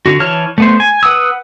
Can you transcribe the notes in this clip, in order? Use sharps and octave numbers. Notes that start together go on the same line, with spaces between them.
D3 F#4
E3 C#5 A5 F6
A3 B3 C5
G#5
B4 F#5 D#6 E6